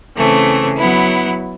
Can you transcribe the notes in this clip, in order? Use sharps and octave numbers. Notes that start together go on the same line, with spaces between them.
C#3 E3 A3 C4
F#3 B3 E4